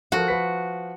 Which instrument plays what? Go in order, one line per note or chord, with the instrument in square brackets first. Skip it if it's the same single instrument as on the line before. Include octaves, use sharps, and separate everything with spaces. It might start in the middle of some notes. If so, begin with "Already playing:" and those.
[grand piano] F3 A4 A#4 [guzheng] F#4
[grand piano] F3 B4 B6